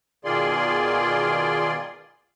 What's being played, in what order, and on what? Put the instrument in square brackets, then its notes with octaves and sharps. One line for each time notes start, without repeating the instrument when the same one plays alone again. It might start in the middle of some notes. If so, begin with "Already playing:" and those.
[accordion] B2 D#3 F4 G#4 D5 C6